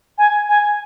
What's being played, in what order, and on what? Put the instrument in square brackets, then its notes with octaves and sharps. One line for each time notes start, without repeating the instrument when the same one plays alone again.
[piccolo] G#5
G#5